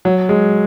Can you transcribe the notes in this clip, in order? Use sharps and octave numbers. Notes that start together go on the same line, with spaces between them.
F#3
G#3